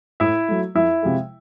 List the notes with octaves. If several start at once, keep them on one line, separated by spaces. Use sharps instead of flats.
A2 E4 E5
F#3 A3
F2 E4 E5
C3 F3 G#3